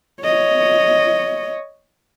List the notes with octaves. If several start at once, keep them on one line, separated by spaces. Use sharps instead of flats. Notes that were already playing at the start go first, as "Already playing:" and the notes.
C#5 D#5